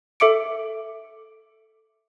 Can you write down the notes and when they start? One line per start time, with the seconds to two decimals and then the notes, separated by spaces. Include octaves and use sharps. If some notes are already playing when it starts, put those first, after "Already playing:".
0.20 A4 E5 D6 C#7 D7